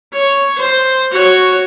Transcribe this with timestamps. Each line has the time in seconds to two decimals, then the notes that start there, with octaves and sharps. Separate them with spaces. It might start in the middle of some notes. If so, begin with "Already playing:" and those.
0.13 C#5
0.58 C5
1.11 F#4 C#5